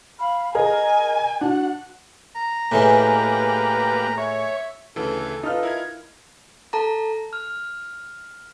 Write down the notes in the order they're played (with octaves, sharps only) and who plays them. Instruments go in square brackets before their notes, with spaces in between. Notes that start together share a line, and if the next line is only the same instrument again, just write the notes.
[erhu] F5 [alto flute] B5
[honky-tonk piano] G#4 A#4 A#5 [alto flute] D#5 [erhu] G#5
[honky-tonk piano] D4 [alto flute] F#4 [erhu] F#5
[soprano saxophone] A#5
[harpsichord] A2 E3 G#3 [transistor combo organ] A#3 G4 B4
[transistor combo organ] C#5 [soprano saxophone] E5
[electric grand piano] D2 C#3 E3 [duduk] A4
[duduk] A4
[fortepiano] D#4 F4 B4 [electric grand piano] A5 F6
[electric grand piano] E4 A#4 G#6
[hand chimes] A4 A5 A#5
F6